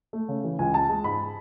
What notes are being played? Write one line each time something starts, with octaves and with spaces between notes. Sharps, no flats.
A3
C#3
E3
C#2 G#5
G#3 A5
G#3
G#2 B5